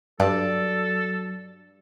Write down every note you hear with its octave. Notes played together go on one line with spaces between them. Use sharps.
G2 F#3 A4 D5 A5